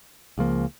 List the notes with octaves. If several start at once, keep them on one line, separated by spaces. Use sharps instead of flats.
C#2 C#3 F3 A#3